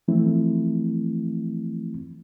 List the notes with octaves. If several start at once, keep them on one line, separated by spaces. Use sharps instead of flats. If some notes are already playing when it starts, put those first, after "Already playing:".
E3 F3 A3 C4 E4